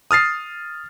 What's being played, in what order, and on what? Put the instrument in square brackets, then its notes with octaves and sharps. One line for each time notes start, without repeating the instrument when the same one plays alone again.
[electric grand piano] D#6 F6 A6 C7